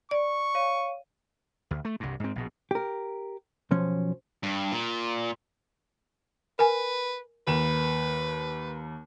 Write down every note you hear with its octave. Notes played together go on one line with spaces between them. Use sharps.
D5 C#6
C#5 F5 D#7
D2
A3
C2 G2
G#2 C4
A#1 B2
G4 A#4
B1 F3 C#4
G2
A#2
A#4 B4 G#5
D#2 A#3 B4 E7